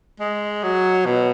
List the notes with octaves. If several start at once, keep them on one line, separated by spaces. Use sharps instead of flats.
G#3
F#3
B2